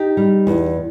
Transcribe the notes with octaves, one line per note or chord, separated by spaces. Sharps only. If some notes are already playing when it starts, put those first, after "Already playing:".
Already playing: D#4 G4
G3
E2